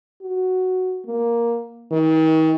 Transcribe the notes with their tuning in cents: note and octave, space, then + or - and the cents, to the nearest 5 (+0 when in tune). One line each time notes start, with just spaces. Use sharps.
F#4 +0
A#3 +10
D#3 +40